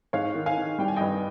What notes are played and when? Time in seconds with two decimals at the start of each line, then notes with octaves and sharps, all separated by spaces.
0.13 G#2 C#5 F5
0.35 D#3
0.46 F5 G#5
0.57 D#3
0.79 G3 G5
0.88 G#5
0.96 G2 D#5 G5